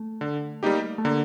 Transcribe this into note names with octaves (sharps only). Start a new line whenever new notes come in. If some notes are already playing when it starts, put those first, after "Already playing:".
Already playing: A3
D3
G3 A#3 D#4 G4
A3
D3 A#3